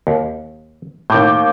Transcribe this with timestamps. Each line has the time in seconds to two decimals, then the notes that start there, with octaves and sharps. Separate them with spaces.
0.07 D#2
1.10 D#2 A2 D6 G6